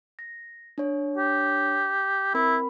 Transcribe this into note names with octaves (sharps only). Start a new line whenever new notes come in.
A#6
D4 C#5
G4
C4 E4 A#4 B5